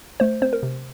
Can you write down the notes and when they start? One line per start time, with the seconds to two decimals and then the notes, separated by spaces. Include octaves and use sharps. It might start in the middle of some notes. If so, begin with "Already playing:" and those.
0.20 A3 C5
0.42 C4 C5
0.53 A#4
0.63 C3